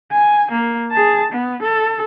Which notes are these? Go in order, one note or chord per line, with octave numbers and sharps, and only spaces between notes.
G#5
A#3
G#4 A5
B3
A4